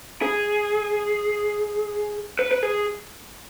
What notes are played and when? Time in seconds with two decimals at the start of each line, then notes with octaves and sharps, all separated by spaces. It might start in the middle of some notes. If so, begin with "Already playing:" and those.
0.22 G#4
2.39 B4
2.51 B4
2.63 G#4